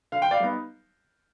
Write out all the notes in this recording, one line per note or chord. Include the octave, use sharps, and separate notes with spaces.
D3 F5
G5
D5 F5
G3 B3 D#4